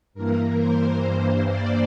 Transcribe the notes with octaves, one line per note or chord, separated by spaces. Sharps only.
G2 E3 A#3 A#4
C5
G2 E3 A#3
D5